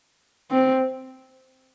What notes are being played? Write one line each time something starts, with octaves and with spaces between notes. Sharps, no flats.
C4